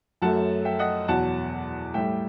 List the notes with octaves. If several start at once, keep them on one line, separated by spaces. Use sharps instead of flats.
F#2 F#3 A3 F#5 A5
E5 G5
D#5 F#5
E2 B2 F#3 F#5 A5
A2 G3 E5 G5